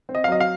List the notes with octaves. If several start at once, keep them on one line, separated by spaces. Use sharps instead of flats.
C4
D#5
F5
F#3 D#5
F5